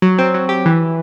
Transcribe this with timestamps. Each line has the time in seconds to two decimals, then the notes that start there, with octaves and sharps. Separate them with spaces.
0.02 F#3
0.18 C4
0.34 F#3
0.49 G4
0.66 E3